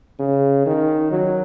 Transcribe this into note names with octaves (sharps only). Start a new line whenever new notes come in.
C#3
D#3
F#3